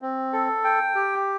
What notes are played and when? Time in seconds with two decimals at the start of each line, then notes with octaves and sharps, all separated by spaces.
0.02 C4
0.33 A4
0.64 G5
0.95 G4